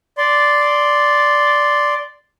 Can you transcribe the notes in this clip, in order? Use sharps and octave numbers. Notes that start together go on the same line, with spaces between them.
D5 C6